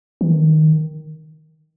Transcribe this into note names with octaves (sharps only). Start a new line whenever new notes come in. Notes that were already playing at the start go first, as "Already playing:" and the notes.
E3
D#3